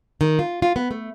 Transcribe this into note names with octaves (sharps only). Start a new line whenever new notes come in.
D#3
F4
F4
B3
A3